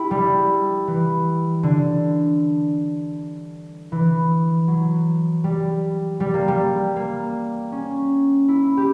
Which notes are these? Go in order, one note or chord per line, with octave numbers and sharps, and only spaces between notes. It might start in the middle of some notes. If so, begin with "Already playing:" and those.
Already playing: E4 G4
G3
E3
D3
E3
F#3
G3
G3
A#3
G3
A#3
C#4
E4
G4